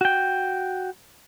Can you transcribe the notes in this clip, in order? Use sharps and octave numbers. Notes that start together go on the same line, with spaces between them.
F#4 G5